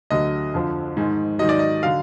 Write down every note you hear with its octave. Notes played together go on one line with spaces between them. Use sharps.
D2 D3 F#3 D#5
F2 D3 F3
G#2 D#3 G#3
G#2 D#3 F#3 D#5
D5
D#5
D3 F#3 F5